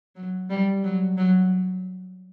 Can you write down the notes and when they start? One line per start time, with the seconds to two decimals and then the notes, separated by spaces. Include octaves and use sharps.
0.16 F#3
0.50 G3
0.84 F#3
1.17 F#3